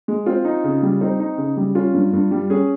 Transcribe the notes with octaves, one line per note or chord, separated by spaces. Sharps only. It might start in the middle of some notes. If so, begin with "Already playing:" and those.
G#3
C4 F4
D#4
C#3
G3
C4 D#4
D#4
C#3
G3
C#4 F4
G2
G2
G3
C#4 G#4